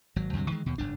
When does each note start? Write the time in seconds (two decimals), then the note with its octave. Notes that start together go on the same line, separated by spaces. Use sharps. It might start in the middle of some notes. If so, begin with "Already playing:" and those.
0.16 G#1 F#3
0.33 D2 G2 C3 F#3
0.50 D#3 E3 G#3
0.66 D#2 B2
0.78 F#1 G#2 D4